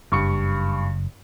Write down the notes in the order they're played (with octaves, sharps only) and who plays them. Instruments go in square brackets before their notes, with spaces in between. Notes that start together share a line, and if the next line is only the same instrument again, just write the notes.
[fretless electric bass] F#1 [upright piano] G2 C#6 C#7